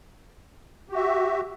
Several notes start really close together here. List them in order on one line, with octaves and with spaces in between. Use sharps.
G4 F#4 E5